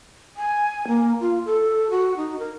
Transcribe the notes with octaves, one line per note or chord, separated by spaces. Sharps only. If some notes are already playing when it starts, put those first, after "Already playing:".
G#5
A#3
F4
A4
F#4
D#4
A#4